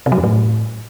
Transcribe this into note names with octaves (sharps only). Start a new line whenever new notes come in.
C3
F#3
F2
A2